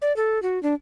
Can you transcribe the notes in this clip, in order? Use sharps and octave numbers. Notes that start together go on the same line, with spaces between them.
D5
A4
F#4
D4